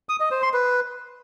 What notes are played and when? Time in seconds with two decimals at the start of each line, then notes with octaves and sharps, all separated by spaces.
0.09 D#6
0.20 D#5
0.31 C5
0.42 C6
0.53 B4